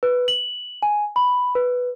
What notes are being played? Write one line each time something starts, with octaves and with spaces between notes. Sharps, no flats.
B4
F#7
G#5
B5
B4